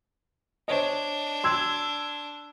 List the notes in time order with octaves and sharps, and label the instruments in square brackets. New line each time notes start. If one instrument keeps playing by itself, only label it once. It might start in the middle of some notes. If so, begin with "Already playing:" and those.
[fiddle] D4 [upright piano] C5 C#5 D#5
[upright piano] C6 E6 G#6